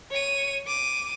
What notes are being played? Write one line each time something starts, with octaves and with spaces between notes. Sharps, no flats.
C#5 D#7
D6 D#7